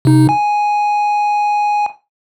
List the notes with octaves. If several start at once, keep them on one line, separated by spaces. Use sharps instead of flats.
C3 D#4
G#5